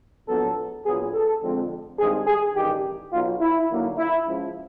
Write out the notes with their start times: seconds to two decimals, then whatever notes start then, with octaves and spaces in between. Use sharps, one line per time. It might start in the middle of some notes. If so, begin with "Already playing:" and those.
0.28 A#1 A2 F#3 B3 A4
0.86 A#1 A#2 F#3 B3 G#4
1.13 A4
1.43 F2 D3 F3 G#3 C4
1.99 G2 D#3 G#3 C4 G#4
2.27 G#4
2.56 A1 G2 D#3 G4
3.13 B1 B2 F#3 F4
3.41 E4
3.70 D#2 D3 F#3 A#3
3.98 E4
4.26 C#2 C#3 F3